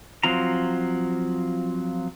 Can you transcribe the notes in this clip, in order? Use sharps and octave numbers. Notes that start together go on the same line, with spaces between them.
F3 F#3 C4 F4 A#5